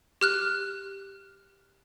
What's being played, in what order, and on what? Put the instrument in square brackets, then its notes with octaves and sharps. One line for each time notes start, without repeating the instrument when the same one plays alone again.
[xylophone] G4 F6 F#6